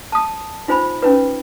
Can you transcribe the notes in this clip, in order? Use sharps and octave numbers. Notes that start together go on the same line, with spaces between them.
A5 D#6
D#4 F4 C5 G#5 B5
C#4 D#4 B4